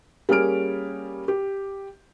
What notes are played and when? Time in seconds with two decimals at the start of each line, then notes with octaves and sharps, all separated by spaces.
0.29 G3 A#3 C#4 G#4 F6 D7
1.28 G4